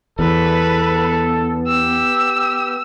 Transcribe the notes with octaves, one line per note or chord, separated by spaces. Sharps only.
E2 B3 A4 B4
G4 E6